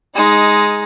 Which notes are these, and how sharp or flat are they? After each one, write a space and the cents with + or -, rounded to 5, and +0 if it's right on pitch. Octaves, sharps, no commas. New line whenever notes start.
G#3 +0 D#4 +10